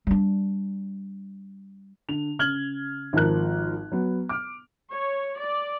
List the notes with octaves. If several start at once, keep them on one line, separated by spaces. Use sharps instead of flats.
G3 D4
D3 F7
C#3 F6 G#6 F#7 G7
G#1 G#2 F3 A#4 F#6
F#3 B3
D6 F6
C#5
D5